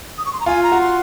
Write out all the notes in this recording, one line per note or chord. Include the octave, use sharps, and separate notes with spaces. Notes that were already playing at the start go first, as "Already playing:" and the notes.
D#6
C#6
C6
A#5
F4 G#5
A#5
F#4
C6